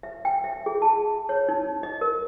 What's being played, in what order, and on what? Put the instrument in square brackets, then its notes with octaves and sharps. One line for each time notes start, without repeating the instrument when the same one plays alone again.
[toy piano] E5
G5
E5
G#4
A5
C#5
D#4
D#5
A#4